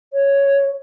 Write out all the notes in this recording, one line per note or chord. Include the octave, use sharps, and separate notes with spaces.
C#5